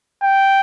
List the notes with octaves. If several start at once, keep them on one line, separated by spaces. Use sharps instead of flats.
G5